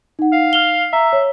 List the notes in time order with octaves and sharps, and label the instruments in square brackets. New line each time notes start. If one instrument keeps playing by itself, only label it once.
[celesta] D#4 F#5
[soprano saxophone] F5
[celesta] F6 F7 G7
[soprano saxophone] E5 [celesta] A#5
[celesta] C#5